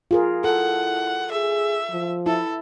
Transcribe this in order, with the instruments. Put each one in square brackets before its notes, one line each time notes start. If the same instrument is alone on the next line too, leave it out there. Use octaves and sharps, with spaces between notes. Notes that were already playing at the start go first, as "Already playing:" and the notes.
[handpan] F4 G#4 A#4
[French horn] E4 [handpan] A4 [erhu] F#5
[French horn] G#4 [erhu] E5
[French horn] F3
[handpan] E4 [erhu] A4